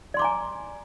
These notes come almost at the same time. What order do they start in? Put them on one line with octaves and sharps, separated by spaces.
D5 C6 D6 A#5 G#5